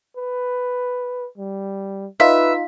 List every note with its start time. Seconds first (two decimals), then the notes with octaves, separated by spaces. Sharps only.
0.17 B4
1.38 G3
2.20 D#4 F4 B4 E5